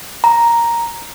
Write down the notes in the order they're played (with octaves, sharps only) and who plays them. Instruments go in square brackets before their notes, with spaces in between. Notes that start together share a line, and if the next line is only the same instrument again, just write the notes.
[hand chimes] A#5